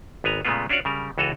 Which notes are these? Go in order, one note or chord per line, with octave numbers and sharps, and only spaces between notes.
G#1 B3 G#5 A#5
A#2 C#3 G#3 A3 B3 F4
C#4 D4 F4 F#4 C#5 D5
C#3 G3 A#4
C#2 E3 F#4 A4 C#5 D#5